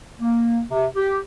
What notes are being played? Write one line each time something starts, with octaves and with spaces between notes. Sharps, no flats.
A#3
C3
G4